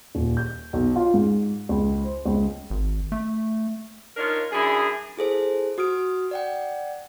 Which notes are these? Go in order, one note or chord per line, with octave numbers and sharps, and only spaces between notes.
D#1
G6
B1
F4
G#2
C#2
C5
C#2
G#1
A3
D4 D#4 F4 A#4 C#5
F#2 D4 E4 G#4
E4 G#4 A4 C5
F#4 D#6 F6 D7
D5 F#5 G5